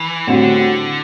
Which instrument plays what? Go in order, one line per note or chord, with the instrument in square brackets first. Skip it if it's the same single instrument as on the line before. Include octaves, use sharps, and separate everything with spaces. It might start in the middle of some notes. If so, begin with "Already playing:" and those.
Already playing: [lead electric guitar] E3
[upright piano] A2 G3 C4 F#4 [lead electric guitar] D3